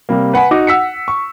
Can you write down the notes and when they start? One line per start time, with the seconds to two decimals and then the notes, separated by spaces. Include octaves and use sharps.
0.09 C3 G3 A#3
0.34 B4 F#5 G#5 B5
0.51 D#4 F#4 D6
0.67 F#5 E6 B6 C#7
1.08 C#6